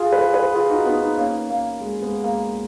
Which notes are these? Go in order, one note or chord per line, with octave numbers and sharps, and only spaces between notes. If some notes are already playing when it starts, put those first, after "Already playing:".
Already playing: F4 G#4
G#4 B4
G#4 B4
F4 G#4
D#4 F#4
B3 D#4
B3 D#4
A#3 C#4
A#3
G#3
G#3 B3
A#3